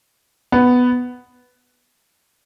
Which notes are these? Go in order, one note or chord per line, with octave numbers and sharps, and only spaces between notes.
B3